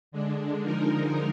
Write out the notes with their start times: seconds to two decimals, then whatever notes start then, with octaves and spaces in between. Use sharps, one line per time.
0.12 D3 G#3 D4
0.62 D3 F3 G#3 D#4 A#4